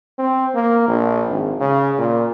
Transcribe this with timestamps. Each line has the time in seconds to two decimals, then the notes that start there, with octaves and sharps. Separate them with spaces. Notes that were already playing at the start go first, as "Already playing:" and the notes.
0.19 C4
0.55 A#3
0.88 A#1
1.30 G#1
1.60 C#3
1.98 A#2